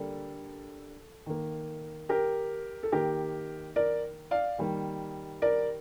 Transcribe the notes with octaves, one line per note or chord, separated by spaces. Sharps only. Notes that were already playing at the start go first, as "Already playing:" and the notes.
Already playing: D3 G3 A#3 A4
D#3 A#3
G4 A#4
A4
D#3 A#3 G4 A#4
A#4 D5
D5 F5
D#3 G3 A#3
A#4 D5